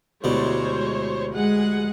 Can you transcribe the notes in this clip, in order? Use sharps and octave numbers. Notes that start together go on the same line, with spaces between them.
D2 B2 G3 G#3 E4 C5 C#5
G#3 G#4 F#5